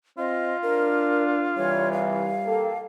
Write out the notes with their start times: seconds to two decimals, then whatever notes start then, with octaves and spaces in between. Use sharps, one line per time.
0.18 C4 F4 D#5
0.63 D4 A#4
1.57 C2 E3 G3 C#5
1.93 F5
2.46 A#3 G4 A4